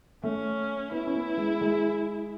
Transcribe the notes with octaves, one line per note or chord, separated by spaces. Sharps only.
A3 C#4
B3 E4
C#4
B3
G#3
G#3